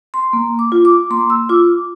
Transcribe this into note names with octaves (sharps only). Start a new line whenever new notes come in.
C6
A#3
D6
F4
D6
A#3 C6
E6
F4 D6